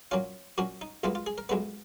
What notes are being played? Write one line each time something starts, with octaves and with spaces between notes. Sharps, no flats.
A#2 F#3 C#4 F4
A#2 F#3 C#4 F#4
D#4
B1 A#2 G#3 B3 F4
F4
G#4
A#4
B1 A#2 G#3 B3 B4